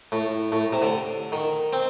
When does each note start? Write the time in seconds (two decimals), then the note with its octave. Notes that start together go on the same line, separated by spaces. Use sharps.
0.12 A2
0.52 A2
0.73 C3
0.82 D3
1.32 D#3
1.73 C4